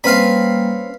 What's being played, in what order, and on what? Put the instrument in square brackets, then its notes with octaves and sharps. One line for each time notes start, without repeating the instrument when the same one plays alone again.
[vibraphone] G3 A#3 [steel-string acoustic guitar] C4 C#4 B4 [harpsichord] F5 B5